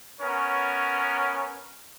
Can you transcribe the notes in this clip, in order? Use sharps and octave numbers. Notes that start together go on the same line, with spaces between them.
B3 C#4 A#4 C#5